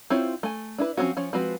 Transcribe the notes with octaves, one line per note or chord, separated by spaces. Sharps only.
C4 E4 F4 C5 C#5
A3 G#5
D4 E4 B4
F3 G3 C4 C#4 F#4
F3 C#4 C#5
F3 G#3 C4 F#4 B4